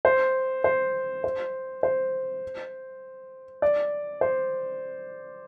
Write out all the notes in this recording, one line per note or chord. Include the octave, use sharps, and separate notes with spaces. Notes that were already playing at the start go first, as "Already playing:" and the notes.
C5
C5
C5
C5
D5
C5